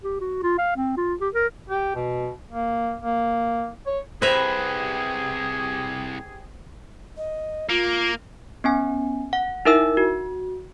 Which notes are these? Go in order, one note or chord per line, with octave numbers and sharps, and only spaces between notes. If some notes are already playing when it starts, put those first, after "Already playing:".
G4
F#4
F4
F5
C4
F4
G4
A#4
G4
B2
A#3
A#3
C#5
C2 G4 G#4 B4 C5 E5 A#6 F7
D#5
A#3 F4
B3 C#4 G#5
F#5
D#4 E4 A#4 E5 E6
F#4